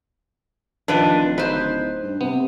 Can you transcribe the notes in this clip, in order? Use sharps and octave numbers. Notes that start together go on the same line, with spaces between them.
D#3 F3 D4 A4 B4
D1
D#4 B4 C5
G2
C3 B3